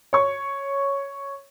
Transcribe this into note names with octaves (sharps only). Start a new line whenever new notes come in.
C#5 C#6